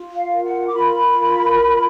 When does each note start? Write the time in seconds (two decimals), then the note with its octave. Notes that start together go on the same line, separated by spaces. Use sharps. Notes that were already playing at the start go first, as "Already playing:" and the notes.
Already playing: F4
0.15 F5
0.30 A#4
0.44 F#5
0.68 D6
0.74 F4 B5
1.19 A#4
1.63 F4